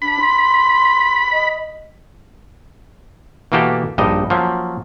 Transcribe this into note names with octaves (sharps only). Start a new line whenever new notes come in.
D4 B5
C6
D#5
B2 E3 A#3 F#4 G4 A4
A#1 G2 G3 D#4 D#5
F3 F#3 A#3 C#4